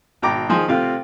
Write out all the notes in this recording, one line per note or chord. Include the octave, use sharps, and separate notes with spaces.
G#1 B2 G5 A#5 D6
D#3 F3 G#4 C5
C3 A3 C4 F4